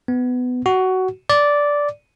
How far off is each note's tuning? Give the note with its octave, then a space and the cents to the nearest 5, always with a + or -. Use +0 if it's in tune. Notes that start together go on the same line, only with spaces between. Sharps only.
B3 +15
F#4 +15
D5 -10